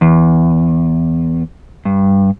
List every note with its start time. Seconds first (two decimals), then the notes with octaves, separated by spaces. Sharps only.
0.01 E2
1.85 G2